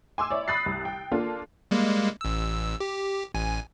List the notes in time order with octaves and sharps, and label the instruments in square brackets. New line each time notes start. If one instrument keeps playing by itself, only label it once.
[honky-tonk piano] G#5 C6 D6 E6
E4 C#5 D5
B5 D#6 F#6 A6 C7
C2
G5
A#3 D4 F4 A4
[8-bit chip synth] G3 G#3 A#3
A1 E6
G4
A1 G#5